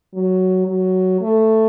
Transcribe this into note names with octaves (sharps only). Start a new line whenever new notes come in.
F#3
F#3
A3